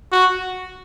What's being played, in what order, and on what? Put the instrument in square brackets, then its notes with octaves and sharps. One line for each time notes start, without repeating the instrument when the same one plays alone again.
[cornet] F#4